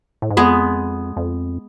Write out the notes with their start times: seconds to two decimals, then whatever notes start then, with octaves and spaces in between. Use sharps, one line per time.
0.22 A2
0.30 G#2
0.37 F2 G#3 B3
1.17 F2